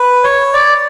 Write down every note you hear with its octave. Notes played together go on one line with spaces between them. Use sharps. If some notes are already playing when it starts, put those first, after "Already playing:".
Already playing: B4
C#5
D5